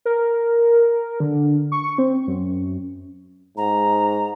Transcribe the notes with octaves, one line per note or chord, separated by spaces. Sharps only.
A#4
D3
C#6
C4
F#2
G#2 A#5